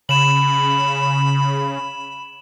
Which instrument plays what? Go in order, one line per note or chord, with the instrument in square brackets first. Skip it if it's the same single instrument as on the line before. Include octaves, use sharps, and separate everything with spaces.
[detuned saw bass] C#3 [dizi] B5 [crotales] E7 F#7